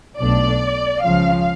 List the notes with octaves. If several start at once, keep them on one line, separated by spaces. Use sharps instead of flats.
B1 B2 A3 D4 D5
C#2 C#3 F3 F5